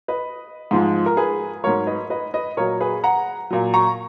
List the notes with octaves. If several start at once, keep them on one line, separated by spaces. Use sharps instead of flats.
B4 D#5
G#2 F3 G#3
A#4
G#4 B4
G#2 F#3 A#4 C#5
B4 D#5
B4 D#5
B4 D#5
A#2 F#3 A#4 C#5
G#4 B4
F#5 A#5
A#2 F#3
A#5 C#6